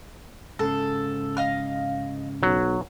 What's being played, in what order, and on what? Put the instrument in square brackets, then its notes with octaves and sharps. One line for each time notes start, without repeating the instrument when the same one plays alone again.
[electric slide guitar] G#2 C#3 [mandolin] A4
[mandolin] D#5 F5 F6
[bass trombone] B1 [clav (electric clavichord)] F#3